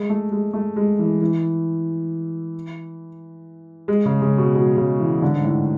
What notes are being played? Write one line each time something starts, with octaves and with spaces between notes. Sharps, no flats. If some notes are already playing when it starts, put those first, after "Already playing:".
Already playing: G#3
A3
G#3
A3
G#3
E3
E3
G#3
C#3
C#3
B2
B2
C#3
E3
D3
G#2
A2